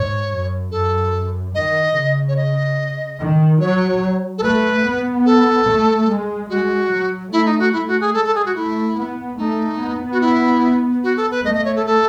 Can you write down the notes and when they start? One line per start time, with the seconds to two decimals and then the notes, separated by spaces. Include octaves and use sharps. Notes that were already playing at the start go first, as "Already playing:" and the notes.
Already playing: G#2 C#5
0.31 F#2
0.71 F#2 A4
1.55 D#3 D#5
1.96 C#3
2.28 C#5
2.36 D#5
3.19 D#3
3.60 F#3 C#5
4.38 A4
4.43 A3 B4
4.84 B3
5.26 A4
5.67 A3
6.08 G#3
6.49 G#3 F#4
6.90 F#3
7.32 A3 E4
7.46 D#4
7.59 F#4
7.73 A3 E4
7.87 F#4
8.01 G#4
8.14 G#3 A4
8.25 A4
8.35 G#4
8.46 F#4
8.55 A3 E4
8.96 B3
9.38 A3 D#4
9.79 B3
10.12 F#4
10.21 E4
11.04 F#4
11.17 A4
11.31 B4
11.44 A3 D#5
11.55 D#5
11.65 C#5
11.76 A4
11.86 A4